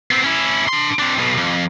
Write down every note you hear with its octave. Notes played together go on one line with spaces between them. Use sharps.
B3 C4
C#4 E4
D4 C6
C4 D4
B1 B2
F2